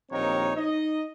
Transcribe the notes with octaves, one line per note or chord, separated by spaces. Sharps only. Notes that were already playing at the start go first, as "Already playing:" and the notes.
A#1 D#2 C4 D#4 A#4 C#5
D#4 D#5